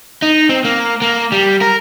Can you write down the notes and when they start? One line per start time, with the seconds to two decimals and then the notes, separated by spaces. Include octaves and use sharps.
0.22 D#4
0.49 C4
0.65 A#3
1.02 A#3
1.32 G3
1.61 A#4